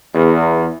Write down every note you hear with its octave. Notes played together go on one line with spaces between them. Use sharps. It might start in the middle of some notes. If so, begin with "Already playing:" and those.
E2